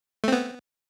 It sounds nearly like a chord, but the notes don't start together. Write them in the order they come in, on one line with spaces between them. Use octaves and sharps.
A3 C4 B3